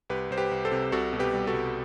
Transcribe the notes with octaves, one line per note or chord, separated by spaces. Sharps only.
C2 G4 B4
C2 C5
G4 B4
C2
A4 C5
C3
C2 F#4 A4
B2
G4 B4
G3
F#4 A4
C2